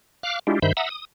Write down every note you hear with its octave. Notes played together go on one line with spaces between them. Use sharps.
F5 D6 F6 F#6
G#3 D4 E4 F4 G4
G2 D#3 C5 E5 B5 G6
E5 F#5 A#5 D#6 E6
D#6